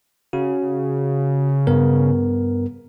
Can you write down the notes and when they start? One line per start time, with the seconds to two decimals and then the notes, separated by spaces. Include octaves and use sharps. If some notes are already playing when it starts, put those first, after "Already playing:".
0.33 C#3 F#4
1.67 G2 B3 A#4